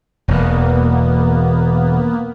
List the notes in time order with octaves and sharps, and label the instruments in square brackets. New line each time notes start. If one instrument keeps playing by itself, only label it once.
[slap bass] E1 E2 [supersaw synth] A#3 B3